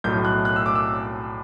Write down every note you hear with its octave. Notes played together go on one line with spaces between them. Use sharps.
B1 A2 F#3 G6
F#6
F#6
E6
D6
E6